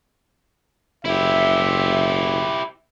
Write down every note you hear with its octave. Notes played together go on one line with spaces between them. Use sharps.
F#1 E4 G4 E5